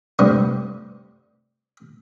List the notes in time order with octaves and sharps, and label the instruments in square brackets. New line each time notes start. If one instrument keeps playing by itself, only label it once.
[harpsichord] G2 C3 G3 A3